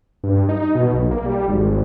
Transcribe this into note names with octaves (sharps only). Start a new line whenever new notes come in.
G2
D#4
B2
B1
A#3
G3
G#1